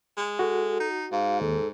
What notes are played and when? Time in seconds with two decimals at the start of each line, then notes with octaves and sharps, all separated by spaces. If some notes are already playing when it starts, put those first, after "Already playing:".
0.17 G#3
0.39 F#4 A4
0.80 D#4
1.12 G#2 F5
1.41 D#2 A4